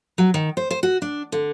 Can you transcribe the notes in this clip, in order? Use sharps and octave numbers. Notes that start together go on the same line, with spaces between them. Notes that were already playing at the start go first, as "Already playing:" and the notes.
F#3
D#3
C5
C5
F#4
D4
D3